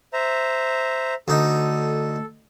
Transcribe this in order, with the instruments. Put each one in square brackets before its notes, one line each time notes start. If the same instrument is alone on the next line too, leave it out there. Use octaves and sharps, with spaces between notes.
[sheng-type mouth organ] C5 E5 A#5
[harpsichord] D2 D#4 [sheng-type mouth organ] A4